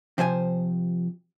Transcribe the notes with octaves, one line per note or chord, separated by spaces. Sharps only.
C3 F3 C5 D#5 G#5